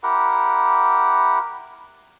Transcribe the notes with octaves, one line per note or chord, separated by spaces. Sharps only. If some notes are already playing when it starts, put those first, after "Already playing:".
E4 G4 A#4 F#5